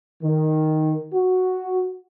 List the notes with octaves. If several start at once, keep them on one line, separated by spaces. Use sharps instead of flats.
D#3
F#4